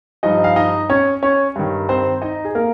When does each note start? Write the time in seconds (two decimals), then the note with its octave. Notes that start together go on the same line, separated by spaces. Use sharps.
0.23 G2 F3 D#4 D#5
0.44 F5
0.56 D#4 D#5
0.90 C#4 C#5
1.23 C#4 C#5
1.56 G2 D#3
1.89 C4 C5
2.22 D#4 D#5
2.45 G#4
2.55 A#3 A#4